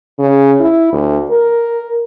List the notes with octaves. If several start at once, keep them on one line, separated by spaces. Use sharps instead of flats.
C#3
E4
D2
A#4